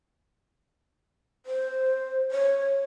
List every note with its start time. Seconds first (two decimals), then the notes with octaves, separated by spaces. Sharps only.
1.46 C5
2.31 C#5